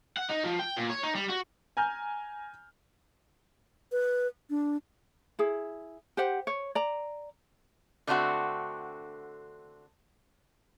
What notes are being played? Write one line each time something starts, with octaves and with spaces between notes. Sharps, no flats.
F#5
D#4
F3
G5
A#2
C#5
D#4
G3
F#4
G#5 A#5 F6 G6
B4
D4
E4 G#4
G4 C5 F#5
C#5
D5 A#5
D3 A3 C4 E4 F#4